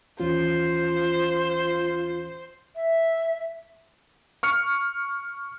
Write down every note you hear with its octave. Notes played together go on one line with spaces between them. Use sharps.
D#2 E3 C#4 F4 C5
E5
C#6 F6 C#7